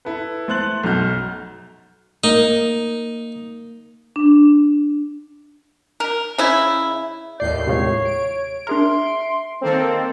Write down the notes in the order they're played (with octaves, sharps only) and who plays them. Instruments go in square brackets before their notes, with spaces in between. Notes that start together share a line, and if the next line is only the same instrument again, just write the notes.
[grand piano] E4 A4 B4
A3 C5 C6 F#6 A6 F#7
B1 F#2 F#4 F6 G6
[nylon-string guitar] A#3 [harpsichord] D#4
[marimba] D4
[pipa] A#4
C#3 E4
[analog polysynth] D#2 A2 C7 [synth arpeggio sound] D5 [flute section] G6
[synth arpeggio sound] C3 F3 G#3 [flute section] C#5
[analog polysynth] D7
[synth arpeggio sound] D4 G#4 A#4 [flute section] E5 C6
[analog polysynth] D#3 A#3 C4 [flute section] A4 A#4